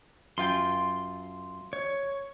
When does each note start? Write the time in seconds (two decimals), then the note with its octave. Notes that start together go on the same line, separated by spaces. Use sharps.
0.38 F#2 F4 G5 C6
1.73 C#5